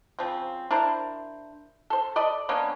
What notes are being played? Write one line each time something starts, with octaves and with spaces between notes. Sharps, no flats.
C#3 F3 C4
D4 E4 A#4 C5
A4 C5
A4 D5 D#5 B5
A#3 B3 C#4 D4